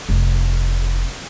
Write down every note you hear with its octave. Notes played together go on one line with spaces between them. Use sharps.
F1